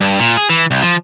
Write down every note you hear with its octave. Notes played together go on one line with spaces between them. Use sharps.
G2
A#2
G#4
E3
C2
F3